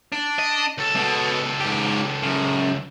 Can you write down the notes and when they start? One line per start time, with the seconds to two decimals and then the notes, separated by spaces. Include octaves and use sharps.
0.12 D4
0.39 D#5
0.78 C#2 A4
0.95 B2
1.60 G#2 G4
2.23 F#2 C#3